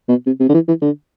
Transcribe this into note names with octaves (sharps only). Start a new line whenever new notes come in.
B2
C3
C3
D3
E3
E3
D3